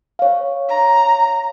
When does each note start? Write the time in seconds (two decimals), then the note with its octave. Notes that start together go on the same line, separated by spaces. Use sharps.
0.19 C#5 F5
0.69 A#5